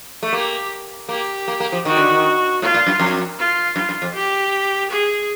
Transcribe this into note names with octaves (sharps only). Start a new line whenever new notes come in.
A3
A#3 G4
A#3 G4
A#3
A#3
F3
D#3 F#4
D3
D#3
A2 F4
A#2
F#2
F2
F4
F#2 F4
F#2
F2
G4
G#4